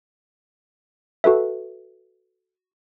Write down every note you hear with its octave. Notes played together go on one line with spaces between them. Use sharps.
F#4 A4 B4 E5